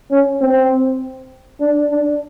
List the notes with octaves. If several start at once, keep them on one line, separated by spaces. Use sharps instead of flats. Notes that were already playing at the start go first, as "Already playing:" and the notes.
C#4
C4
D4
D4